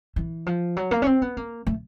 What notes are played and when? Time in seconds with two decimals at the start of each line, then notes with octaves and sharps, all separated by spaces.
0.16 E3
0.46 F3
0.77 F#3
0.91 A#3
1.02 C#4
1.06 C4
1.22 B3
1.37 A#3
1.67 A3